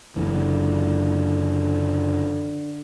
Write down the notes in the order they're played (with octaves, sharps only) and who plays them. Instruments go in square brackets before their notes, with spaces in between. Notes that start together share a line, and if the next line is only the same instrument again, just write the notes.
[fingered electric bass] F#1 F#2 E3 [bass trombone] D3